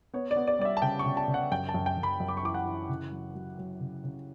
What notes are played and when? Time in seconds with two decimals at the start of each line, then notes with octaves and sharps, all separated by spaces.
0.13 B3 C#5
0.31 D5
0.36 B3
0.47 D5
0.59 G3 D5
0.65 E5
0.77 A5
0.82 C#3 G5
0.99 C#6
1.06 C#3
1.17 A5
1.28 C#3
1.34 F#5
1.51 F#2 G5
1.69 A5
1.74 F#2
1.86 G5
1.97 F#2
2.03 B5
2.20 F#2
2.28 D6
2.37 C#6
2.43 E3 D6
2.54 F#5
2.66 E3
2.89 C#3
3.12 F#3
3.35 F#3
3.59 F#3
3.80 C#3
4.04 C#3